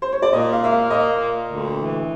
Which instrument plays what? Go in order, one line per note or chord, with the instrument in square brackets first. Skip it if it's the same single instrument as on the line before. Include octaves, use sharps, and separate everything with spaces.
[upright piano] C5
C#5
D5
[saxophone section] A#2 [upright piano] D#5
[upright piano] F5
[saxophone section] A#3 [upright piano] E5
[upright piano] F5
[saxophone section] A#2 [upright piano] D#5
[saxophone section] A#2
D2
E3